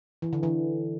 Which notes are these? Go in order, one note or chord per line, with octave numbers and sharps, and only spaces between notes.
E3
D3
E3